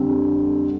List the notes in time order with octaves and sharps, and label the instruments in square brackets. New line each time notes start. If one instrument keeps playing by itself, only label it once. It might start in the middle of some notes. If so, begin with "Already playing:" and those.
Already playing: [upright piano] F2 D3 G3 C4